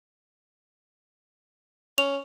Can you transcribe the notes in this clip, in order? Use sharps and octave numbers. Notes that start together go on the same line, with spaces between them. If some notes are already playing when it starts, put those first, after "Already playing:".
C#4 F7